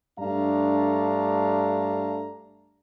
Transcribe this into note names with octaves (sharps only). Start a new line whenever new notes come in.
G2 A3 D4 F5 A5 A#5